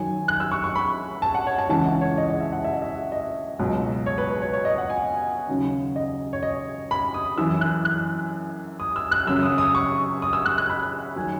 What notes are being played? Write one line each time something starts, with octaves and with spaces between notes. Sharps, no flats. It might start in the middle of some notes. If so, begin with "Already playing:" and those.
Already playing: F#2 D#3 F#3 G#5
F#6
E6
C#6
C#6
B5
A5
F#5
C#5
A5
C#2 C#3 E3 A5
F#5
C#5
D#5
D#5
E5
F#5
E5
D#5
E5
D#5
C#2 B2 F#3
C#5
B4
B4
C#5
C#5
D#5
F#5
G#5
D#2 C#3 F#3
D#5
C#5
D#5
B5
D#6
F#2 E3 E6
F#6
F#6
D#6
E6
F#6
F#2 C#3 F#3 E6
D#6
D#6
C#6
D#6
E6
F#6
F#6
B5
D#3 F#3 G#5